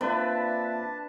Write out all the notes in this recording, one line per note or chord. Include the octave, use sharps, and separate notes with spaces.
A#3 C4 D4 F4 B4 E5 A5 B5